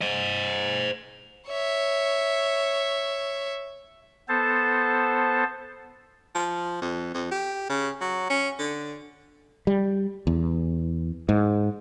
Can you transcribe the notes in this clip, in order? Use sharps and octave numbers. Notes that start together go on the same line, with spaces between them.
C5 D#5
C#5 E5
B3 A4 C5 A5
F3
F2
F2
G4
C#3
F#3
C#4
D3
G3
E2
G#2